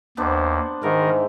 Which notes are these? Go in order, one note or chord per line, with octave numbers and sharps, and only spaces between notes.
D#2 B3 D4 C5
G#2 D#3 E3 A#4